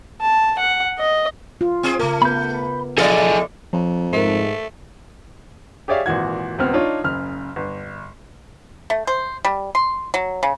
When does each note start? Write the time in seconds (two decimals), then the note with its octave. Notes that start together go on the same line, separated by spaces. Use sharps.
0.21 A5
0.59 F#5
0.98 D#5
1.61 F4
1.83 C4 G#4
1.99 C#3 A3 A#4
2.22 B3 B4 B5 G6
2.98 F3 D4 E4 G#4 A4 D5 D#5
3.73 F2 F3
4.13 G#2 A3 A#4 C5
5.88 G4 G#4 C#5 D5 E5 F5
6.06 G#1 A#2 E3 F#4 G#6
6.58 D#1 C#2 B3 C4 F6
6.73 D4 D#4 F4 C#5
7.04 F#1 C#3 F6
7.56 G1
8.90 A3
9.07 C5
9.45 G3
9.75 C6
10.14 F#3
10.43 C#3